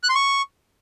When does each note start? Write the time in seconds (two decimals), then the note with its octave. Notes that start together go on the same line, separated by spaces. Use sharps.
0.03 F#6
0.09 C6
0.15 C#6